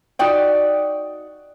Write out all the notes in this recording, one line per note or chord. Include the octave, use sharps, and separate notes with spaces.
D#4 F#4 D5 G5